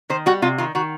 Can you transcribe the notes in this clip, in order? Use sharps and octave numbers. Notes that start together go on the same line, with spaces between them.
D#3 C5
G3 F#4
C3 F4
D#3 F4
D#3 F#4